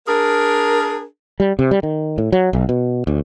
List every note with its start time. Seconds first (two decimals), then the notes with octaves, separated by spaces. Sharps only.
0.08 D4 G#4 A#4
1.40 G3
1.59 C3
1.71 G3
1.83 D#3
2.18 A2
2.32 F#3
2.53 B1
2.69 B2
3.07 D2